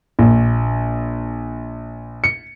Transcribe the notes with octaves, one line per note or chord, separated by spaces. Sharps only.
A#1
C#7